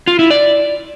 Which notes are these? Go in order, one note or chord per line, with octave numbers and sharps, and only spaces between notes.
F4
E4
D5